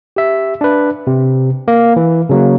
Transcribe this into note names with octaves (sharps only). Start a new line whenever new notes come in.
G4 E5
D4 B4
C3
A#3
E3
C#3 F#3 A#3